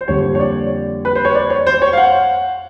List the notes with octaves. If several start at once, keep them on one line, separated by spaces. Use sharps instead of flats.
C5
F2 D3 G3 A#3 C#5
C#5
D5
B4
C5
C#5
D5
C#5
C5
C#5
F5
F#5